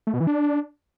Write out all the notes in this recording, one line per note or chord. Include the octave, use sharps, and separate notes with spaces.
A3
B2
E3
D4